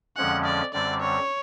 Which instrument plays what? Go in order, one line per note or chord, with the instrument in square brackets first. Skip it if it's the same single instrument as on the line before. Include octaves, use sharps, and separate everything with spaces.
[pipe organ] F2 D3 F3 G#3 C#4 [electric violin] F#5
[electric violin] D5
[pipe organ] F#2 D3 G3 C4 [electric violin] D5
[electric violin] C#5